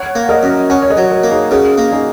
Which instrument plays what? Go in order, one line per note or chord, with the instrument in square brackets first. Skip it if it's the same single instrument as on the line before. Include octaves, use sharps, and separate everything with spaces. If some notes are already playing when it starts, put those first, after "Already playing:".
Already playing: [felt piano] C#5 F#5
[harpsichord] A#3
[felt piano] A#4 D#5
[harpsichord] F#2
[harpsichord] C#4 [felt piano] C#5 F#5
[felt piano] C#5
A#4 D#5
[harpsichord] F#3
[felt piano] F#4 A#4
[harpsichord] A#3
[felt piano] D#4 G#4
[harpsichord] C#3 [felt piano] F#4 A#4
[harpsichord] A#3
[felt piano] D#4 G#4